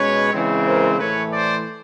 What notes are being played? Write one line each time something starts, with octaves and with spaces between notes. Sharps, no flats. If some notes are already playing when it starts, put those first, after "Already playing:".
Already playing: B2 G#3 C#4 B4 C#5
C#3 E3 G#3 C4
A#4 C5
A2 E3 A3 B4 C#5
C5 D5